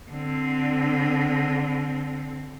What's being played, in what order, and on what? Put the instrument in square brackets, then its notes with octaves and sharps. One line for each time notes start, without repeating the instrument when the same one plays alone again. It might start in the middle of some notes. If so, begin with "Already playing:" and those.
[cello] D3 C4